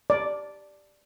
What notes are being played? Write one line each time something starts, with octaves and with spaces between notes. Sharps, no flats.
D5